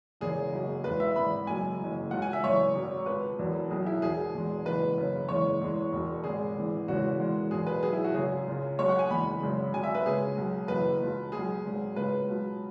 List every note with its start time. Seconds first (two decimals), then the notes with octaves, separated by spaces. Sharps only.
0.21 E1 E2 C#3 E3 G#4
0.53 F#1 F#2 F#3
0.84 E1 E2 E3 G#3 B4
1.00 E5
1.16 G#1 G#2 E3 B5
1.47 F#1 F#2 F#3 G#5
1.80 F#1 F#2 E3
2.11 C#2 B2 F#3 F#5
2.22 G#5
2.33 E5
2.43 G#1 F#2 C#3 E3 C#5
2.75 G#1 F#2 F#3
3.06 C#2 B2 G#3 B4
3.39 E1 E2 B2 F#3
3.70 B1 B2 F#3 G#4
3.86 E4
4.02 E1 E2 B2 G#4
4.34 E1 E2 B2 G#3
4.65 F#1 E2 E3 B4
4.97 F#1 F#2 C#3
5.29 F#1 E2 E3 G#3 C#5
5.61 E2 E3 G#3
5.93 E1 E2 B2 G#3
6.24 G#1 G#2 G#3 G#4
6.56 G#1 G#2 E3 G#3
6.88 E1 E2 C#3 E3 G#3 F#4
7.19 E1 E2 E3 G#3
7.51 E1 E2 B2 F#3 G#4
7.67 B4
7.83 B1 B2 F#3 G#4
7.93 E4
8.04 F#4
8.15 G#1 F#2 C#3 G#4
8.47 C#2 C#3 G#3
8.79 B1 B2 G#3 C#5
8.89 F#5
8.99 G#5
9.10 F#1 E2 E3 G#3 B5
9.42 G#1 F#2 C#3 G#3
9.73 G#1 F#2 F#3 G#5
9.84 E5
9.95 B4
10.06 C#2 C#3 G#3 G#4
10.37 B1 B2 F#3
10.68 F#1 F#2 E3 B4
11.01 C#2 B2 G#3
11.32 B1 B2 G#3 G#4
11.65 G#1 G#2 F#3
11.95 C#2 C#3 G#3 B4
12.27 C#2 B2 F#3